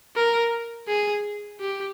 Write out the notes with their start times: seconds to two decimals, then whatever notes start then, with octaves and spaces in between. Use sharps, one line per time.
0.16 A#4
0.88 G#4
1.60 G4